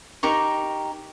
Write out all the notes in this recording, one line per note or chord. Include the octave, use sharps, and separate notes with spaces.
D#4 G4 A#4 C#6